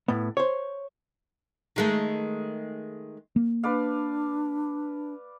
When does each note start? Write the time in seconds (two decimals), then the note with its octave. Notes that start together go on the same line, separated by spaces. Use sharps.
0.08 A2 B3
0.37 C5 C#5
1.76 D#3 G#3 A3
3.36 A#3
3.63 D4 B4 D5 F5